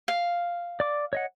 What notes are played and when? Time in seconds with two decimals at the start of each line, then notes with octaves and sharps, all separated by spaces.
0.08 F5
0.80 D5 D6
1.13 C#5 D#5 F#5